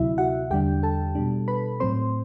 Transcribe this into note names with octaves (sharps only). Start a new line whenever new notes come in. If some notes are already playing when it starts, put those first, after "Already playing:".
Already playing: D2 C3 F#3 E4 E5
F#4 F#5
E2 D3 G3 D4 G4 G5
A4 A5
B2 G3 D4
B4 B5
A2 F#3 C4 C5 C6